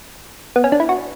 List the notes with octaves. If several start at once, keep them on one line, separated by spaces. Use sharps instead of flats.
B3
C#4
D4
E4
F#4